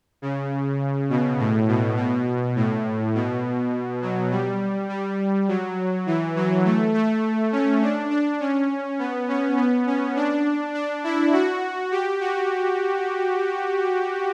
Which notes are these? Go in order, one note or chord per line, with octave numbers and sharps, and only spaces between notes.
C#3
B2
A2
B2
B2
A2
B2
F#3
G3
G3
F#3
E3
F#3
A3
A3
C#4
D4
D4
C#4
B3
C#4
B3
C#4
D4
D4
E4
F#4
G4
F#4